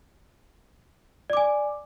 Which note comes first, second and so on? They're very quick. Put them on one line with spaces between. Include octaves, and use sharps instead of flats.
D5 D6 G#5